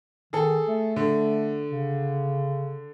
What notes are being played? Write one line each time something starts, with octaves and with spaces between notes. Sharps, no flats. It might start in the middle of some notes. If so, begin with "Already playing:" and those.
D#3 G#4 A4
A3
D3
C#3